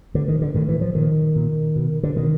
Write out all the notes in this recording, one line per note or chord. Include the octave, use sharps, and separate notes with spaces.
A2 D3
D#3
D3
A2 D#3
E3
F3
A#2 D#3
A#2
B2
D3
B2 D#3